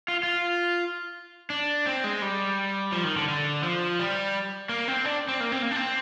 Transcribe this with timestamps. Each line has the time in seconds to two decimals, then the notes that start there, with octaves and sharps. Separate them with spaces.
0.08 F4
0.23 F4
1.50 D4
1.86 C4
2.04 G#3
2.22 G3
2.92 F3
3.04 D#3
3.17 D3
3.28 D3
3.63 F3
4.00 G3
4.69 A#3
4.88 C4
5.05 D4
5.28 C4
5.40 A#3
5.52 C4
5.63 A#3
5.71 D4
5.76 C4